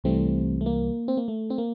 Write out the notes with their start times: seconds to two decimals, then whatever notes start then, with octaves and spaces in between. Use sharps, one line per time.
0.04 C2 C3 E3 G3 A3 C4
0.61 A3
0.66 A#3
1.08 C4
1.17 A#3
1.28 A3
1.50 C4
1.58 A#3